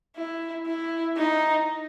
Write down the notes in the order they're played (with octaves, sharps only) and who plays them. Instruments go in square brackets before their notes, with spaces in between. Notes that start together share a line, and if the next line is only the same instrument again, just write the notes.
[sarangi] E4
E4
D#4